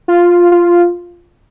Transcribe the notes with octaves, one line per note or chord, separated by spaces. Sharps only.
F4
F4